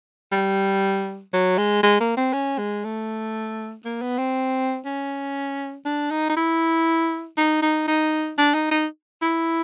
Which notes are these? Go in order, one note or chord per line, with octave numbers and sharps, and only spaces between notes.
G3
F#3
G#3
G#3
A#3
C4
C#4
G#3
A3
A#3
B3
C4
C#4
D4
D#4
D#4
E4
D#4
D#4
D#4
D4
D#4
D#4
E4